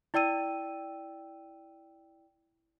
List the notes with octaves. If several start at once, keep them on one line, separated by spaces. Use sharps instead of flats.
E4 D5 G5 E6 D#7